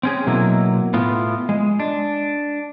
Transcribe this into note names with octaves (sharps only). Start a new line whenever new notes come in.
C4 C#4 G#4
B2 F#3 A#3 E4
A2 B3 F4
G#3
D4